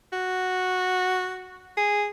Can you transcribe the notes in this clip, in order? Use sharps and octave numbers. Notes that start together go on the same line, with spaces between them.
F#4
G#4